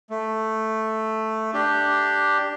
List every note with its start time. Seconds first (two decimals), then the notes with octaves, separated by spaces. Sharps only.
0.10 A3
1.54 D4 G4